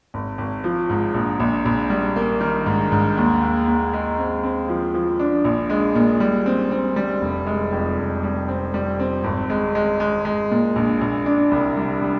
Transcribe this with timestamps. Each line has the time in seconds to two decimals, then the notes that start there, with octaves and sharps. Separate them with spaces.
0.14 G#1
0.38 G#1
0.64 F3
0.90 G#2
1.14 A#1
1.40 A#1
1.65 A#1
1.90 G3
2.16 A#3
2.41 D#3
2.66 G#2
2.92 G#2
3.17 D#2
3.42 D#2
3.67 D#2
3.93 G#3
4.18 C4
4.43 C4
4.68 F3
4.94 F3
5.19 D4
5.44 A#1
5.69 G#3
5.95 A#2
6.20 G3
6.46 C4
6.71 C4
6.96 G3
7.21 F1
7.47 G#3
7.73 F2
7.98 F1
8.23 G3
8.48 C4
8.74 G3
9.00 C4
9.24 G#1
9.50 G#3
9.75 G#3
10.00 G#3
10.25 G#3
10.51 A#2
10.76 A#1
11.01 A#1
11.26 D4
11.51 C2
11.77 G3
12.02 G3